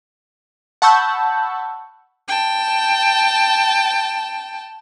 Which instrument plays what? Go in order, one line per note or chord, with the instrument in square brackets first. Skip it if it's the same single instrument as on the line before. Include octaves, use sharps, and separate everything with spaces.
[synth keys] F#5 A5 B5 C#6 E6 G6
[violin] G5 A5